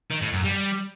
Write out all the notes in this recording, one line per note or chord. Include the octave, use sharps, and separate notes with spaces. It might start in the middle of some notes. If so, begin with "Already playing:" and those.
D#3
A2
F#2
G3